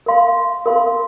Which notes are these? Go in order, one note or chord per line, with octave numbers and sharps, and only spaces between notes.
A#4 F5 C6
A#4 F5 C6